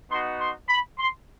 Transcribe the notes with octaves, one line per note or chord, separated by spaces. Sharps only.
B3 D#4 F#4 C6
C6
B5
C6